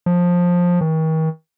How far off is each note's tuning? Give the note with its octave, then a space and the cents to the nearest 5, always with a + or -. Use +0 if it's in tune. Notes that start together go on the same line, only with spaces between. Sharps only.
F3 +15
D#3 +40